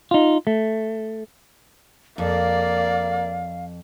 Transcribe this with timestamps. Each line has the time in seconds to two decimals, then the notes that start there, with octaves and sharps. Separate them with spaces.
0.11 D#4 F4
0.47 A3
2.18 F2 A#3 D5 F5